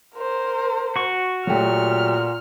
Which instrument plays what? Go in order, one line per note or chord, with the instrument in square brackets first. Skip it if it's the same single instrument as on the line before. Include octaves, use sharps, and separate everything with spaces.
[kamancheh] A#4 C5
[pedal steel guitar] F#4 C#6
[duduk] A#2 [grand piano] F#3 A3 G4 [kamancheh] F6